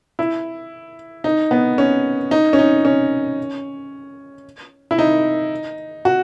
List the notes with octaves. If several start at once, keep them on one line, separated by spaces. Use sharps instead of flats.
E4
D#4
B3
C#4
D#4
C#4
D#4
C#4
E4
D#4
F#4